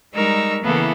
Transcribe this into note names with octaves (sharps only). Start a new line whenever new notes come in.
G3 G#3 D#4 A#4 C#6 E6
C#3 E3 A#3 B3 E4 A4